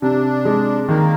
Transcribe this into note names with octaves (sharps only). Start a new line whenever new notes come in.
C3 D4
G#3
D#3 A#3